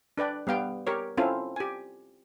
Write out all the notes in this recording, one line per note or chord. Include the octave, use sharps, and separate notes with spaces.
D4 B4 D5 G5
G3 B3 F5 G5
G4 A#4 C#5
C4 C#4 E4 F4 A4 F5
G4 G#5